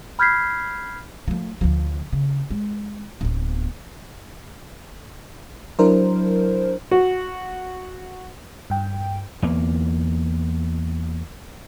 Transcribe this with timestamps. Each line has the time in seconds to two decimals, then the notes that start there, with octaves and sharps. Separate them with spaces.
0.19 B5 F6 G6 G#6 B6 C7
1.28 F3 A3
1.61 D2 F3
2.13 C#3
2.50 G#3
3.21 D1 B3
5.79 F#3 D4 E4 A#4 C5
6.91 F#4
8.70 G2 G5
9.42 E2 A#3